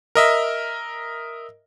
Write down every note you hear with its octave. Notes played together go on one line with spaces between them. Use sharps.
A#4 D#5 E5